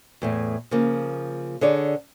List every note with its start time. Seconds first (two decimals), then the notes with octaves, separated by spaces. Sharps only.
0.22 E2 A2 A3
0.71 C#3 F3 A#3
1.61 D3 G#4 C#5 D5